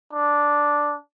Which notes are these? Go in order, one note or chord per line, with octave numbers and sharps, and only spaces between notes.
D4